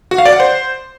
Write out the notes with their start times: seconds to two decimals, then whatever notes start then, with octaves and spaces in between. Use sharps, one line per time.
0.11 F#4
0.18 F5
0.25 D5
0.33 F#5
0.40 C5